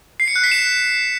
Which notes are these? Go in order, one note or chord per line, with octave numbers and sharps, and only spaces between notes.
C7
C#7
F#6
B6
E7